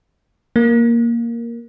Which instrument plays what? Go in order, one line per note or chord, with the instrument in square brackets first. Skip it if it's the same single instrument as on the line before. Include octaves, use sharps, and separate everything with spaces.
[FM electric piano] A#3